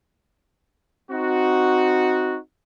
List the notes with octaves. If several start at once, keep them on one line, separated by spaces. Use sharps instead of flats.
C4 D#4 F#4